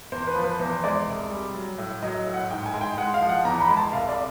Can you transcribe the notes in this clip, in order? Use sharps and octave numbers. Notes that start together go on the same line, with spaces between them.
E2 C5
B4
F3
B4
E2 C5
G#3 D5
C2
G3
F#3
A2
F#3 D#5
A2
F#5
G#2 G5
G#5
G#3
G5
G#3 F#5
F5
F3
F#5
E2 A#5
B5
G#3
A5
C2 F5
D5